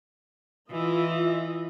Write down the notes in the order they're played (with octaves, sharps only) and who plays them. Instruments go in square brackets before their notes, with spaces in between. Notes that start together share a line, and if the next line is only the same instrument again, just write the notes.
[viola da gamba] E3 [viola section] F4 D#5 E5